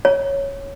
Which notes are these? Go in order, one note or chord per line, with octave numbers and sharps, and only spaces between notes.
C#5